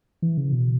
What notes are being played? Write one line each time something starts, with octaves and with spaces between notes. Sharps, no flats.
E3
C#3
B2